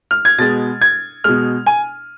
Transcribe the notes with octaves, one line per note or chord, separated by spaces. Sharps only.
F6
G#6
B2 G#3 A6
G#6
B2 G#3 F6
G#5